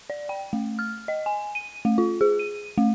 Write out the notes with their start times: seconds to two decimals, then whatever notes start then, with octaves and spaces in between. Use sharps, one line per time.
0.10 D5
0.29 G5
0.53 A3
0.79 F6
1.08 D#5
1.26 G#5
1.55 D#7
1.85 A3
1.98 F4
2.21 G#4
2.39 D#7
2.78 A3